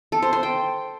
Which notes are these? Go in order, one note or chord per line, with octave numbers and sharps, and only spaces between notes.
A4
C5
C5
G5